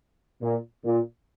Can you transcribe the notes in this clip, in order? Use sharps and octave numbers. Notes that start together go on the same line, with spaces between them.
A#2
A#2